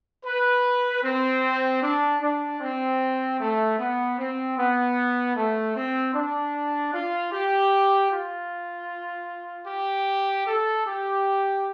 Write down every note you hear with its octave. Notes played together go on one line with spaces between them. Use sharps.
B4
C4
D4
D4
C4
A3
B3
C4
B3
A3
C4
D4
F4
G4
F4
G4
A4
G4